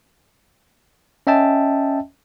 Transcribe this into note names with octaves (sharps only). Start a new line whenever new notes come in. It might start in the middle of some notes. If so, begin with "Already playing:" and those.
C#4 D#5 E5 G5 A5